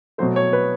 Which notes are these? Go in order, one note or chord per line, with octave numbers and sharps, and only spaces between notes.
B2 F#3 A3 C5
C#5
B4